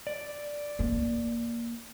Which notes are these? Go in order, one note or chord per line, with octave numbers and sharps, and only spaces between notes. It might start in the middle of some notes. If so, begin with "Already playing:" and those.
D5
A#3